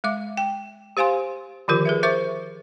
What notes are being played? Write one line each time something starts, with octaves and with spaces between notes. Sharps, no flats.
G#3 E5 D6
G5
G4 C5 F5 G#5 C6
D3 D#3 F3 F4 G4 A#4
G#4 B4 E5
A#4 C5 E5 C#6 D6